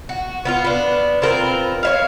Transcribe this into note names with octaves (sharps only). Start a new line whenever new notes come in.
F#4
B3 E4 F4
B3 D4
C4 F4 A#4 B4
C#5 E5 F5